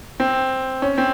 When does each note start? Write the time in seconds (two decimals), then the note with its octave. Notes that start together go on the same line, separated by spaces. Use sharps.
0.20 C4
0.82 C#4
0.98 C4